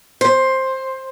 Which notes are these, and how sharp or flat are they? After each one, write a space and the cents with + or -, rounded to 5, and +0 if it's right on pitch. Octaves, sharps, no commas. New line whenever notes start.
C5 +10